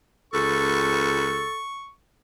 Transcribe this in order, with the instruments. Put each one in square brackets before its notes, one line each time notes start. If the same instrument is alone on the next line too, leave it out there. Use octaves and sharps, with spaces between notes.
[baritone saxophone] C#2 [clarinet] A4 [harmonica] C#6